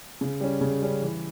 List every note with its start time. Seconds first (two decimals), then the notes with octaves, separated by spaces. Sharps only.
0.21 C#3
0.41 G3 C#4
0.61 C#3
0.82 G3 C#4
1.02 E3